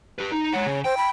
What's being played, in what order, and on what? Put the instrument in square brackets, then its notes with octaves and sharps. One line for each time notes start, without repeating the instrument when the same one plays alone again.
[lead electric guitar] G4 B4
D#4
[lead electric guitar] G#3 F#5 [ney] C#5
[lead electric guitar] C#3
[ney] C5 [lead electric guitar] G5
[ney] B5